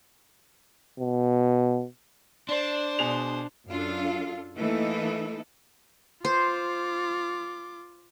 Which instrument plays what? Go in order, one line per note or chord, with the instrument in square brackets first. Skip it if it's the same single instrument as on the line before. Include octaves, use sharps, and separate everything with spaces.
[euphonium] B2
[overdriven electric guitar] D4 [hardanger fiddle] C5 [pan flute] D5
[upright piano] B2 G#4 F7
[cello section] F#2 D4 F4 A4 F5
E3 A3 A#3 D#4 A4
[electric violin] F4 D6 [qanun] C5